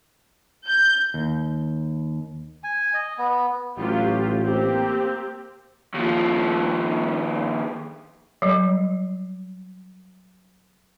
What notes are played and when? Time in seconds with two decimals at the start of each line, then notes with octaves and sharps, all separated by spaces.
0.66 G6
1.14 D#2
2.64 G#5
2.94 D#5
3.18 B3
3.78 A1 F#3 F4 G4
4.44 A#3 C4 G4
5.95 D#2 F3
8.42 F#3 G3